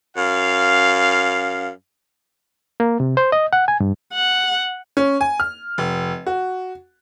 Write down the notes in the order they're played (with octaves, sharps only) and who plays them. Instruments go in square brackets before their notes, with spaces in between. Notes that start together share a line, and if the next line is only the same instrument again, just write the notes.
[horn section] F#2 F5
[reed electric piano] A#3
C3
C5
D#5
F#5
G#5
G2
[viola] F#5
[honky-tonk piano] C#4
G#5
F6
F1
F#4